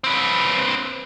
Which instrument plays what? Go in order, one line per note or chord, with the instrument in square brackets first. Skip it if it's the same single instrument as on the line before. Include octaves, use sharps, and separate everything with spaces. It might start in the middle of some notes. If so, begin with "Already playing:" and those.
[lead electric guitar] C4 B4